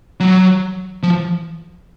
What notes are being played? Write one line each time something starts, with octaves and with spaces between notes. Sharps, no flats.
F#3
F3